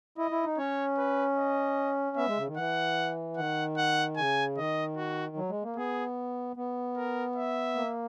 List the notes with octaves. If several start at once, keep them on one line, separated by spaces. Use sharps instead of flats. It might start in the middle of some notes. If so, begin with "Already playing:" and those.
E4 D#5
E4
D#4
C#4 C#5
B4
D#5
B3 E5
G#3
C#3
D#3
E3 F#5
D#3 F#5
F#5
C#3 G#5
D#3 D#5
F#4
F#3
G#3
A#3
B3 G#4
B3
A#4
E5
A#3